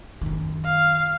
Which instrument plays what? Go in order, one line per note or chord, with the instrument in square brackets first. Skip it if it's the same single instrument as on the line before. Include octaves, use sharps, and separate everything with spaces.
[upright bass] F#2 D#3
[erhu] F5